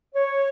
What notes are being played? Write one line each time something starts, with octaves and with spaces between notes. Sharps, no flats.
C#5